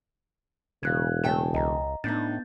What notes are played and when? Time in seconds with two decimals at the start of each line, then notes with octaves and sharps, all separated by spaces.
0.83 E1 C#3 F5 F#6 G#6
1.24 C#3 A3 G5 A5
1.54 C#2 D#5 A#5
2.04 A2 B3 D4 D#4 G6 A6